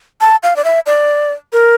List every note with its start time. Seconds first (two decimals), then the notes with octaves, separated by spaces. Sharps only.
0.21 A5
0.43 F5
0.56 D5
0.65 E5
0.86 D5
1.53 A#4